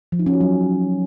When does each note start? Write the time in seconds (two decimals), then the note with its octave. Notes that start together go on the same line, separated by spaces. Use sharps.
0.12 F3
0.19 D#4
0.26 C#4
0.33 F#4
0.41 F#3